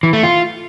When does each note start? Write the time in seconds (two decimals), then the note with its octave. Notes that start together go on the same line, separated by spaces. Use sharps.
0.03 E3
0.13 A3
0.23 F4